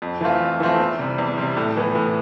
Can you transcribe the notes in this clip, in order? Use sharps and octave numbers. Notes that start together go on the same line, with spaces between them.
F2
E3 A3 C4 F4
F2
E3 A3 C4 F4
E2
C3 G3
E2
C3 G3
A2
E3 B3
A2